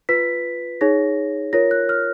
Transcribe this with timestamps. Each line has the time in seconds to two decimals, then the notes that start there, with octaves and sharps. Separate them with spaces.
0.09 F4 B4 B6
0.81 D#4 G#4 C#5 A#6
1.53 F4 A#4 C#5 A#6
1.71 F#6
1.89 F6